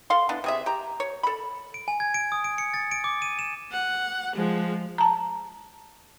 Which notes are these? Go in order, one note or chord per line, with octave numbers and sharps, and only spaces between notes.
A4 F5 C6
E3 B3 D4
C3 G#4 E5
G4 A#5
C#5
A4 B5
D7
G#5
G#6
D7
D#6
D7
C#7
A6
D7
D6
D#7
E7
F#5
F3 G#3
A5 A#5